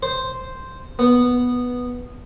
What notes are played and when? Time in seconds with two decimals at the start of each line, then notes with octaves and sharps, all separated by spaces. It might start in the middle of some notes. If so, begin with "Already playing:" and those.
0.03 C5
0.99 B3